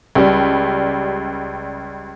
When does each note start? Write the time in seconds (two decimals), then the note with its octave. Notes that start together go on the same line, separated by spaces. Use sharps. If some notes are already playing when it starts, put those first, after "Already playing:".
0.15 C#2 G3